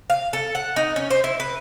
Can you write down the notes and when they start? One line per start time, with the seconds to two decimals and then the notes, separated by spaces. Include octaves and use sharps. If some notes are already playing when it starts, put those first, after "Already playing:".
0.10 F5
0.33 A4
0.55 F#5
0.76 D#4
0.96 C#4
1.10 C5
1.24 E4
1.40 B4